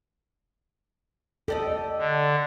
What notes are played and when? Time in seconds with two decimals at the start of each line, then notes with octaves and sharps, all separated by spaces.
1.48 G4 A4 D5 D#5
1.99 D3